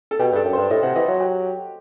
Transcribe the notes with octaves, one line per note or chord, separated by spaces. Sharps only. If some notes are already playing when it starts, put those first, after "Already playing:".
A4
B2 G4
G2 A4
F#2
G2 C5
A2 D#5
C3 F#5
E3 D#5
F#3
G4